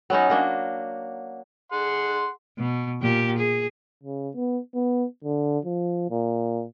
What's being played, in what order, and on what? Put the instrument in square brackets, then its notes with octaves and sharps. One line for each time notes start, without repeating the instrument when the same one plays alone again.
[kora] F#3 B3 C#4 D#4
F#3 A#3 D4
[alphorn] G#4 [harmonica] F#5 C6
[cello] B2
A#2 G4
G#4
[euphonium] C#3
B3
B3
D3
F3
A#2